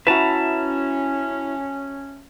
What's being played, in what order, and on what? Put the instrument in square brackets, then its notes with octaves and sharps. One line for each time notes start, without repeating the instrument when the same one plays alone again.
[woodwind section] C#4 [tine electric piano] E4 [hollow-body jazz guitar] F#4 B4 [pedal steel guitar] E5 A5 A#5